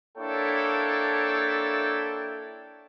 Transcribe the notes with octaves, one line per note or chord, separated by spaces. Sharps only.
A#3 D4 E4 A4 C#5 G5